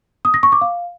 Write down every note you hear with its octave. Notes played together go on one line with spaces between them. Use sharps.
D#6
A#6
C#6
D6
F5